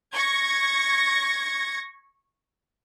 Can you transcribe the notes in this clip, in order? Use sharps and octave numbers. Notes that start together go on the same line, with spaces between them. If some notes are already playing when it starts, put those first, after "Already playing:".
C#6 G#6 A#6